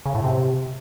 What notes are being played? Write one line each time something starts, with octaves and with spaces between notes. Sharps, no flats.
C#3
A2
C3